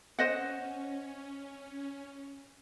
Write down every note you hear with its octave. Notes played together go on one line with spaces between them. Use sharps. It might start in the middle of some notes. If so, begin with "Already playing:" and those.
C#4 C5 D#5 F#5